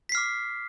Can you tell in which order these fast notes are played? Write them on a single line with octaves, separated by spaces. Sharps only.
B6 C7 F6 D6